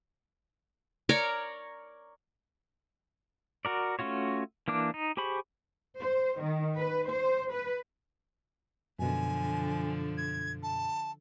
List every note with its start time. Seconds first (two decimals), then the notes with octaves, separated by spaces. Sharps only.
1.09 A#4 C#5 D5
3.65 F#4 A#4 D5
3.99 A3 C#4 F4 F#4 C#5
4.68 E3 A#3 D4 D6
4.94 D#4
5.17 G4 G#4 C5 B5 C#6
6.00 C5
6.40 D#3
6.77 B4
7.08 C5
7.52 B4
8.99 F#2 B2 D3 F3 G#5
10.17 G#6
10.63 A5